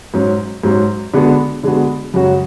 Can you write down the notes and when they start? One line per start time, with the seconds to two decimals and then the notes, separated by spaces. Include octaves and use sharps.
0.14 G#2 F#3 C#4
0.63 G#2 F#3 C#4
1.14 D3 G#3 B3 F#4
1.63 D3 G#3 B3 F#4
2.14 F#2 C#3 G#3 C#4 F#4